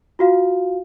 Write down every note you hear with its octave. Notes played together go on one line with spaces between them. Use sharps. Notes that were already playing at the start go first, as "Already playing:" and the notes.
F4 F#4 F5